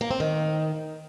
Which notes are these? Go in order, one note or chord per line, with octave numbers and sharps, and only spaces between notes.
A#3
C4
D#3